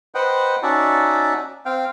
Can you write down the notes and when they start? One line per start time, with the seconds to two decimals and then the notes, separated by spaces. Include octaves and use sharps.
0.15 B4 C5 D#5 F#5 G5
0.63 C#4 D#4 F#4 D5 E5 A5
1.66 C4 F5 G5